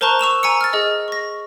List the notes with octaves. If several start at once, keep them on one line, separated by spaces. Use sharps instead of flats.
A#4 C5 A5 A#5 C#6 F#6
C#6 E6 E7 F7
G#5 A#5 E6 C#7
F6 A6
G#4 D#5
C#6 A#6